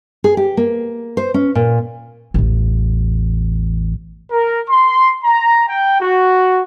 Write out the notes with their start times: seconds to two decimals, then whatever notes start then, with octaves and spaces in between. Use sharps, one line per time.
0.24 G#4
0.37 G4
0.57 A#3
1.17 C5
1.34 C#4
1.55 A#2
2.34 A1 E2
4.31 A#4
4.67 C6
5.23 A#5
5.67 G5
6.00 F#4